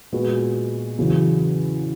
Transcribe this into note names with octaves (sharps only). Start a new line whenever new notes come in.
A#2 G#3 B3 F#4
E2 C#3 F#3 C#4